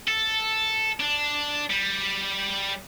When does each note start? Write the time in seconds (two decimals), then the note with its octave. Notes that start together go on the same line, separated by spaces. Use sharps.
0.08 A4
1.00 D4
1.70 G3